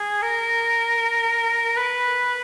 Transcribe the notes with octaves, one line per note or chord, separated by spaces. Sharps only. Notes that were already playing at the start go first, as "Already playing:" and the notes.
Already playing: G#4
A#4
B4